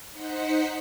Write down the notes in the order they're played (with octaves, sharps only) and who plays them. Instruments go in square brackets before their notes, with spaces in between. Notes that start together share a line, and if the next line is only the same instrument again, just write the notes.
[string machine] D#4 C5 F#5 B6 C#7